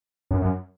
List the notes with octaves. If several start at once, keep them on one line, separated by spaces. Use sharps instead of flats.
F#2
F#2